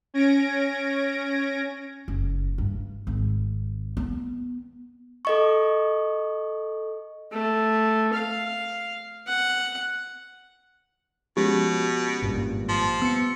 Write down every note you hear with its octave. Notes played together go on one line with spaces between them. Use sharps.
C#4 G#6 A#6 D7
F#1
G2
G#1
B3
A4 D#5 C#6
A3
F5
F#5
B2 F3 G#3 C#4 G4
G#1 G2 A#2
F3
B3 E6 C#7